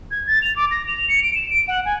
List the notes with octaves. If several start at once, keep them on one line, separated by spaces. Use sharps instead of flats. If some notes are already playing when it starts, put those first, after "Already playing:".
G#6
A6
F7
D6
A#6
F7
C#7
D7
E7
D7
F#5
G#5